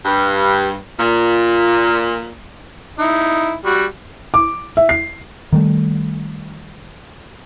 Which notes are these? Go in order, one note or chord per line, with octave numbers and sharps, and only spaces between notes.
G2
A#2
D#4 E4
G3 F#4
D6
E5
C7
D#3 G3 A3